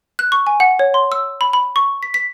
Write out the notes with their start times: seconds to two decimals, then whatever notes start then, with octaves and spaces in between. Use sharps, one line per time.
0.19 F#6
0.32 C#6
0.47 G#5
0.60 F#5
0.79 C#5
0.94 C6
1.12 E6
1.41 B5
1.53 B5
1.76 C#6
2.03 B6
2.14 B6